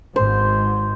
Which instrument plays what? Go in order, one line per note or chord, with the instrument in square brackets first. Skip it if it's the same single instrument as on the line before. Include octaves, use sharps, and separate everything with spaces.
[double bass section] G#1 G#2 [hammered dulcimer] C5